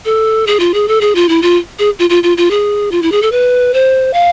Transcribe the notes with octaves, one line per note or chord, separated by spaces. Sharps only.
A4
G#4
F4
G#4
A4
G#4
F4
E4
F4
G#4
F4
F4
F4
F4
G#4
F4
E4
G#4
A4
B4
C5
F5